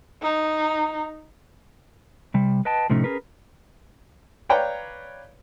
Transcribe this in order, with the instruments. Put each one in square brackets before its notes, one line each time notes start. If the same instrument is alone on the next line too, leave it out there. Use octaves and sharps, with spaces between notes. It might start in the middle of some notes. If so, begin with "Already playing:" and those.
[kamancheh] D#4
[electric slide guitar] C3 G3
B4 D#5 G5 A5
A2 C3 F3 A3 C#4 D#4
C#4 G#4 A#4 B4
[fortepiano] B4 C#5 D5 F5 G5 A#5